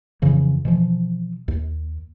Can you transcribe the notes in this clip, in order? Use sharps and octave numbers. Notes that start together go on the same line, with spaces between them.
F2 C#3 E3
B2 E3 F3
D#2